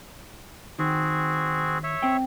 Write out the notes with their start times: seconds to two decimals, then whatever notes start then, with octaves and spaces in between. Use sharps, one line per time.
0.79 D#3 C4 F#4 G#4
1.84 C#5 E5
2.02 C4 G5